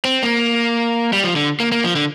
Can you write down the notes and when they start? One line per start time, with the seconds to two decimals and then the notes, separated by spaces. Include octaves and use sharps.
0.05 C4
0.23 A#3
1.13 G3
1.24 F3
1.36 D3
1.60 A#3
1.72 A#3
1.84 F3
1.96 D3